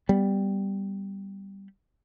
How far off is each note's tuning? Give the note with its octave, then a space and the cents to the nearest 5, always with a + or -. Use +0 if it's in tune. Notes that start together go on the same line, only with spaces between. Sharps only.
G3 +0 B3 +0